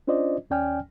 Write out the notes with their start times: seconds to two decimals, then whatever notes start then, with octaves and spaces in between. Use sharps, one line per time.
0.07 C#4 D4 F4 C5 D5 D#5
0.50 D#2 C#4 D5 G5 G#5 F6